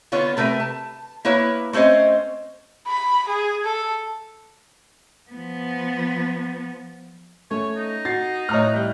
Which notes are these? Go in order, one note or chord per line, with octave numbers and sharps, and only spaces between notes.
D3 B3 F4 C#5
C3 A3 A#4 B4
A5
A#3 E4 B4 C#5
A3 C4 C#4 C5 D#5
B5
G#4
A4
F3 B3
A3 C#4 C#5
D#4
F#4 A6 C7
A2 C#5 D#5 A#5 F6 F#6
G3 G6